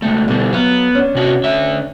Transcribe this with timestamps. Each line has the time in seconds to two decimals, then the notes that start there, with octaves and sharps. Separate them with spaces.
0.02 C#2 A3 G5
0.28 B2 D3 G3
0.53 F#3 B3 F5
0.95 C#4 D4
1.15 C3 F#4
1.44 D3 E5